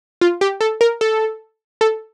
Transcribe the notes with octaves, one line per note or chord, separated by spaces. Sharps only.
F4
G4
A4
A#4
A4
A4